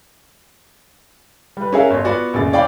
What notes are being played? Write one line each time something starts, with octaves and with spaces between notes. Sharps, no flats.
G3 B4
C#4 F#4 G#4 A#4 E5 F5
G1 C#5
B3 F4 F#4 D5
F1 A#1 C#3 A6
C#5 D5 F5 G5 B5 D6